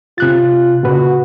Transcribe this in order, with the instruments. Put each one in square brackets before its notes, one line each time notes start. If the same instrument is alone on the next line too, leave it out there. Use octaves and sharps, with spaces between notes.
[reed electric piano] C3 F#6 A6 [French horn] F4
[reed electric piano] A#2 C#3 B4 [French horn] F#4